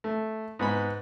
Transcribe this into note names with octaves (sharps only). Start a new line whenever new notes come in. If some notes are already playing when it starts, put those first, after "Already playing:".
A3
G#2 B3 B5